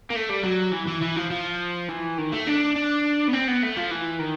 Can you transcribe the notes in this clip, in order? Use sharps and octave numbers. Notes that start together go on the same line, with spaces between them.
A#3
A3
G3
F#3
E3
E3
E3
F3
F3
E3
D#3
A3
D4
D4
B3
C4
B3
A3
F3
E3
D#3